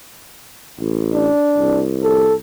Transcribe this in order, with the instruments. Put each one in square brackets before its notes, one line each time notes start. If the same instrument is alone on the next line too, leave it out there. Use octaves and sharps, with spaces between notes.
[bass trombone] A1
[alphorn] D4
[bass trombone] C2
[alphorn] A4